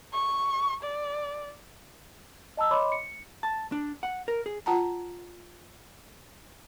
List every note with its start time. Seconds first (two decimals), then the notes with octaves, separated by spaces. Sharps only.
0.13 C#6
0.83 D5
2.57 D#5 A5 A#5 E6
2.71 C#5 D#5 B5 C6 D6
2.92 C#7
3.43 A5
3.72 D4
4.03 F#5
4.28 A#4
4.46 G#4
4.66 F4 F#5 A5 A#5